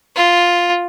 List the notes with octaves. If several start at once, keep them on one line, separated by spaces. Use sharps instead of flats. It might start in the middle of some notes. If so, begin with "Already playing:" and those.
F4